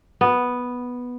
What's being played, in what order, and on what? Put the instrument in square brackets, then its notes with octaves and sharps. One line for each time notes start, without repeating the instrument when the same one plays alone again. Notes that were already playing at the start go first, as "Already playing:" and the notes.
[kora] B3